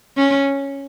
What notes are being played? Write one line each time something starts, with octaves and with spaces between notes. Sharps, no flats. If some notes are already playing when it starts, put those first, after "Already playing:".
C#4